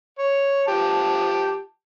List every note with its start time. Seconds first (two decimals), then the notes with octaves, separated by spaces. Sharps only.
0.19 C#5
0.68 F3 G4 A5